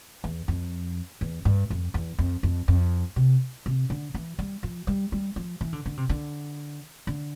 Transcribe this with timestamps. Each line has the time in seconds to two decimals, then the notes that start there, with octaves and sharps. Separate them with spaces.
0.24 E2
0.48 F2
1.21 E2
1.45 G2
1.70 F2
1.94 E2
2.19 F2
2.43 F2
2.68 F2
3.16 C3
3.66 C3
3.90 D3
4.14 E3
4.39 G3
4.63 F3
4.87 G3
5.12 G3
5.36 F3
5.61 E3
5.73 D3
5.86 D3
5.97 C3
6.09 D3
7.07 D3